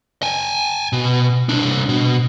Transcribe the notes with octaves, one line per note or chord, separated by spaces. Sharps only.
G5 G#5
B2
C2 D4
B2